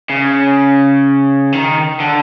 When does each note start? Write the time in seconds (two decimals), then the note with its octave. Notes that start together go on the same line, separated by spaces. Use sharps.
0.10 C#3
1.53 D#3
2.00 D3